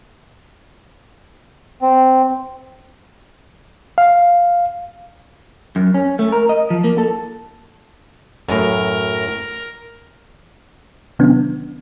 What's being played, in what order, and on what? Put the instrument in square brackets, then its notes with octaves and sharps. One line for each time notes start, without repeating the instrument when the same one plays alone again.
[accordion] C4
[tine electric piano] F5
[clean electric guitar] F#2
C#4
A3
A#4
D#5
F3
A#3
A4
[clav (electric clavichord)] F#2 A2 [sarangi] A#4
[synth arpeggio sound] C3 D#3 F#3 B3 C#4 D4